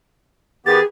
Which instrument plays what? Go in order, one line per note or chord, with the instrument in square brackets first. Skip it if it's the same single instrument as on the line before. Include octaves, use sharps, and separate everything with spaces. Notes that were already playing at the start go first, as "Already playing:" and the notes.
[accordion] D#3 B3 G4 [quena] G#4 [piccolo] A6